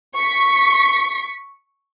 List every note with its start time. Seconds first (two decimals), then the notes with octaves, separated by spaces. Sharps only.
0.17 C#6 B6